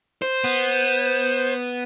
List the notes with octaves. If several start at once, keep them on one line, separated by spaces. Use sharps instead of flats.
C5
B3